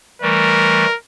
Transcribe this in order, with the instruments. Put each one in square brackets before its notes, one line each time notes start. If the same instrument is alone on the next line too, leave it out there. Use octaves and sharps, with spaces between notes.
[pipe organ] E3 G3 A3 [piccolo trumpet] A#4